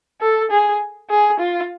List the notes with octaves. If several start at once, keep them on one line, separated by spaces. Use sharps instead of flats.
A4
G#4
G#4
F4